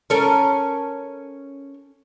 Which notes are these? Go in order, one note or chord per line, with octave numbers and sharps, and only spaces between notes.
C#4 A4 A#4